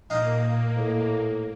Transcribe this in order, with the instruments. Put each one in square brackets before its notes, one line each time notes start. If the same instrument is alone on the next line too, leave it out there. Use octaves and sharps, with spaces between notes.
[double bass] A#2 [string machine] A#3 [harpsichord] D#4 F5
[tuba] A2